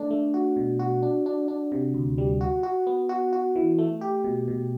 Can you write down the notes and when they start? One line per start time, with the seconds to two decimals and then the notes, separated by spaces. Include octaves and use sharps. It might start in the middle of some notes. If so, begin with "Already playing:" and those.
Already playing: A3 D4
0.11 A3
0.34 F#4
0.57 B2
0.79 F#4
1.03 D4
1.26 D4
1.48 D4
1.72 C3
1.94 D2
2.18 G3
2.41 F#4
2.63 F#4
2.87 B3
3.09 F#4
3.33 F#4
3.56 E3
3.78 A3
4.01 G4
4.24 B2
4.48 B2